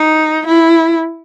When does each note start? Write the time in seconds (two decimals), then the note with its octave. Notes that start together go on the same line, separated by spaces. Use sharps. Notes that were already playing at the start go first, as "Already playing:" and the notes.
Already playing: D#4
0.47 E4